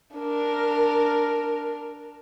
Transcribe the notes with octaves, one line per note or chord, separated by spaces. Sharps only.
D4 A#4